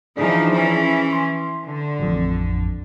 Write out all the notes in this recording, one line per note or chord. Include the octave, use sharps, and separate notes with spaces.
E3 F3 D4 D#4 G#4
E3 C#4
C6
D3
A1 F2